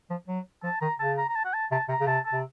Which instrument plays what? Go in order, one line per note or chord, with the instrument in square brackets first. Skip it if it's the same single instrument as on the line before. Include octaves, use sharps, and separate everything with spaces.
[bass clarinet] F3
F#3
[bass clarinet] F3 [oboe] A5
[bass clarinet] D#3 [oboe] A#5
[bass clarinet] C#3 [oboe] A5
[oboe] A#5
A#5
A5
F#5
A5
[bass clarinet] C3 [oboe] A5
[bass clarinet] C3 [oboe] A#5
[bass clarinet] C#3
[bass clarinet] C3 [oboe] A5
[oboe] A5
[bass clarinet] C3